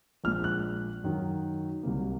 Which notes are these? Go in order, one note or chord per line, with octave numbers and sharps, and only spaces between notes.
A#1 A#2 G#3 F6
F#6
F#2 D#3 F#3
C2 C3 F#3 A#3